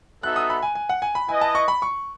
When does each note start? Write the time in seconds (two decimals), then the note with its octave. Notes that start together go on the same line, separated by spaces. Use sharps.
0.22 B3 D#4 F#4 A4 E5 F#6
0.36 D#6
0.50 B5
0.62 G#5
0.75 G#5
0.89 F#5
1.02 G#5
1.15 B5
1.29 E4 B4 D#5 G#5
1.41 A5
1.55 C#6
1.68 B5
1.82 C#6